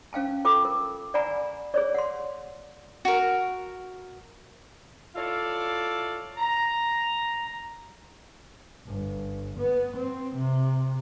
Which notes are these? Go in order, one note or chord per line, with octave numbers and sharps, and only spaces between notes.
C#4 F5 G5 A5
F4 A4 G5 D6
A#4
D5 F#5 G#5 A#5 B5
G#4 C#5 D5
F#5 C6
F#4 A#4
E4 F4 A4 C#5 D5 F5
A#5
G1
B3
C4
C3